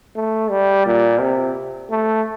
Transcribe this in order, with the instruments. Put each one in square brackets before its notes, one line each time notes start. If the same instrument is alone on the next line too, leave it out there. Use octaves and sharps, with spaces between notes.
[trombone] A3
G3
A#2
C3
A3